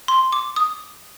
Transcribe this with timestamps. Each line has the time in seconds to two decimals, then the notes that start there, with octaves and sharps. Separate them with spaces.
0.08 C6
0.32 D6
0.56 D#6